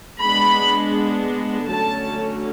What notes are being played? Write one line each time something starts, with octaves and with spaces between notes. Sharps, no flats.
G#3 B3 D4 B5
D3 F#3 A3 C#4 A5